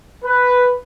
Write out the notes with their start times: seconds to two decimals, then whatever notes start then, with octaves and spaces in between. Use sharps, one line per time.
0.24 B4